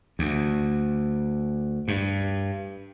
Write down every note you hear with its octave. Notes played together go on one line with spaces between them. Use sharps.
D2
G2